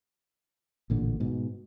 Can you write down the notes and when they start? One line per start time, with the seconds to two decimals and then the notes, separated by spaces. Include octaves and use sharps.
0.90 A1 A#2 D3
1.20 G#2 B2